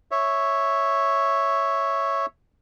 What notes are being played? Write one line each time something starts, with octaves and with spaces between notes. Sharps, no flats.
C#5 E5